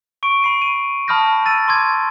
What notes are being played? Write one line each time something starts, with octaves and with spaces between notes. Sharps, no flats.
C#6 D7
B5 C7 D#7
D#7
A5 B5 D#6 F6 G6 A#6
E6 A6 D#7
C6 D6 G#6